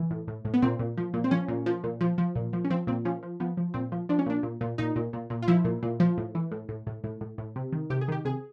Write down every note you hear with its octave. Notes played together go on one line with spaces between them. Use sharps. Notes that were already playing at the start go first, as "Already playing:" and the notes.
Already playing: E3
A2
A2
A2
B3
A#2 C4
A#2
F3
A#2
C4
F3 C#4
A#2
F3
A#2
F3
F3
A#2
F3
C#4
F3 C4
A#2 C4
F3 C#4
F3
F3 B3
F3
A#2 C4
F3
F3 D4
C#4
A#2 D4
A#2
A#2
A#2 D#4
A#2
A#2
A#2
F4
F3 E4
A#2
A#2
F3
A2
E3
A2
A2
A2
A2
A2
A2
C3
D#3
C3 G4
G#4
D#3 G4
C3 G#4